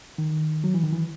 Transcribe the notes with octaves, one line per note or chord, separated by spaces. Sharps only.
D#3
F#3
E3
D#3
E3